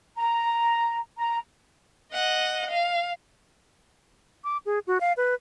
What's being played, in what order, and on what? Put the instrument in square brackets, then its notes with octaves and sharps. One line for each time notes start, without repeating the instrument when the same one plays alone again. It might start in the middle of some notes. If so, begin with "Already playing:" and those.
[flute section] A#5
A#5
[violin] D#5 F#5
F5
[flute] D6
G#4
F#4
F5
B4